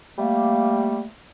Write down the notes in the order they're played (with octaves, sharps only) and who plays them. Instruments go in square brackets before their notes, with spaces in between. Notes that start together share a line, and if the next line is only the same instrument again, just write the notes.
[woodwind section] G3 A3 A#3